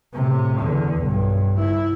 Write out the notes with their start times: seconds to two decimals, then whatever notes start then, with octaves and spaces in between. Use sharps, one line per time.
0.13 A2 C3
0.60 E2 D3
1.02 B1 G2
1.54 G1 E4